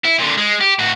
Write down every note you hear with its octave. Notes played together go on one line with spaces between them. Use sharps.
E4
A#2 D3
G#3
G4
A2 F#4